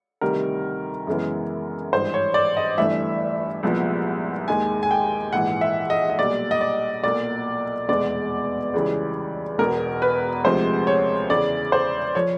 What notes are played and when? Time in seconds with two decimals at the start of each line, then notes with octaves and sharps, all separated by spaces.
0.21 D2 C3 D#3 G3 A#4
1.07 F#2 C#3 E3 G#3 B3
1.92 G#1 G2 E3 C5
2.14 C#5
2.34 D5
2.57 D#5
2.78 G1 G2 E3 A3 E5
3.63 C2 A#2 F3 G#3 B3
4.48 D#2 D#3 G#3 G#5
4.83 G#5
4.91 G5
5.33 A#1 G#2 E3 F#5
5.61 E5
5.90 D#5
6.10 D#5
6.19 B1 A#2 G3 D5
6.51 D#5
6.61 D5
7.04 B1 A#2 F#3 A#3 D5
7.89 F1 E2 B2 G#3 B3 D5
8.74 C#2 C#3 E3 G3
9.59 E1 E2 B2 A#4
10.02 B4
10.44 D2 C3 F3 G#3 C5
10.87 C#5
11.30 E2 C#3 E3 D5
11.72 C5
12.15 F3 C#5